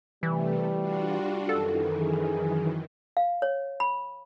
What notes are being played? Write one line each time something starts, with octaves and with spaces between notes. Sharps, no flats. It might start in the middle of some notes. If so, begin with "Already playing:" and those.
C3 E3 G3 A3
D4 F4 F#4
F#2 D#3 E3 A4
G#4
F5
C#5
B5